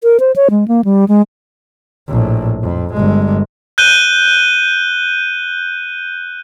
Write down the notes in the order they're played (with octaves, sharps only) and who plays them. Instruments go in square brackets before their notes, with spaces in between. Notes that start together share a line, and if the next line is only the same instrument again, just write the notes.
[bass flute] A#4
C5
C#5
G#3
A#3
G3
G#3
[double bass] A#1 A2
F2
G1 G#3
[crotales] F#6 G6 D#7 G7